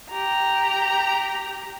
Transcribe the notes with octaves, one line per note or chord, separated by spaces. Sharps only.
G4 A#5